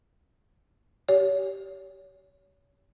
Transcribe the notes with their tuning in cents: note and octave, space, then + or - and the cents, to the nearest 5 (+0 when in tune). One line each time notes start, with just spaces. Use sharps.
G4 -15 C#5 +30